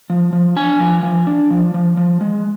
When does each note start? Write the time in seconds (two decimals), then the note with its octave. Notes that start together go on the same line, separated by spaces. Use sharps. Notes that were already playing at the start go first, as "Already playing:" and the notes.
0.10 F3
0.33 F3
0.56 D4 G#5
0.80 F3
1.03 F3
1.27 D4
1.50 F3
1.74 F3
1.97 F3
2.21 G#3